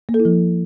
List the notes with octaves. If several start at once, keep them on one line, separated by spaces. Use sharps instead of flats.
A#3
A4
E4
F3